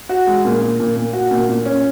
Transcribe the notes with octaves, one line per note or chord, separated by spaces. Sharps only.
F#4
G#3
A#2
A#2
A#2
A#2
F#4
A#2
A#2
C#4